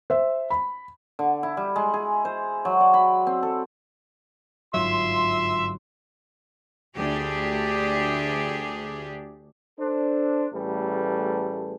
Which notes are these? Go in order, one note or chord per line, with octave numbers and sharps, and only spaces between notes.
C5 E5
B5
D3
E4
G3
G#3
G#4
C5
F#3
D5
B5
C4
A4
G1 G#2 F#3 F4 E5 C6
D2 A3 D4 G4 G#4
D4 A4 C5
A1 G3 A3 G#4 A4 B4